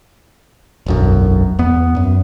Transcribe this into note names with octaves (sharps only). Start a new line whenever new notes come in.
E1 B1 F#2
E2 B3
F#2